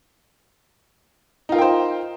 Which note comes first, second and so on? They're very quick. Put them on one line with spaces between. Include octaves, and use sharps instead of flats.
D#4 F4 A#4 G5 C5